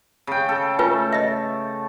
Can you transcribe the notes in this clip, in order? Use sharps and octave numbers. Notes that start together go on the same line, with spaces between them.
C#3 G5
A4
A3 F4 B4 G#5
D#5 E5